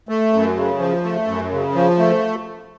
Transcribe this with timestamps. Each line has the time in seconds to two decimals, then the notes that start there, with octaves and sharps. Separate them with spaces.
0.09 A3
0.33 F#2
0.56 C#3
0.79 F3
1.04 A3
1.27 F#2
1.51 C#3
1.75 F3
1.99 A3